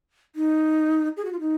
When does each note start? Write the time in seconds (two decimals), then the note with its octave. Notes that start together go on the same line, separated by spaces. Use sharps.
0.36 D#4
1.17 G#4
1.25 F#4
1.32 F4
1.40 D#4